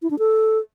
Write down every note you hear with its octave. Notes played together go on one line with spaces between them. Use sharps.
E4
D4
A4